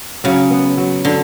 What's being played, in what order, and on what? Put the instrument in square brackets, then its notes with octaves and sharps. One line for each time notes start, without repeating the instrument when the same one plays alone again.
[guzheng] C#3 [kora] F#3
[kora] B3
F#3
[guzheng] D3 [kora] F#3